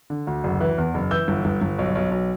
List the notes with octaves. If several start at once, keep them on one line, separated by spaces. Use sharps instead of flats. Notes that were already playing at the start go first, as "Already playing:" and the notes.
D3
D2
F#1
E3
E2
F#1
E3 E6 G6
G1
G1
G1
B1
B1
B1